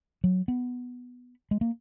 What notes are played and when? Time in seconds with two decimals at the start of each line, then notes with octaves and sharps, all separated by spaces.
0.24 F#3
0.48 B3
1.51 G#3
1.61 A#3